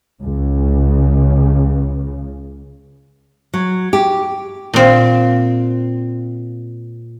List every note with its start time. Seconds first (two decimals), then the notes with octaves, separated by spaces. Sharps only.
0.20 C#2 C#3
3.54 F#3
3.93 G4
4.74 A#2 C4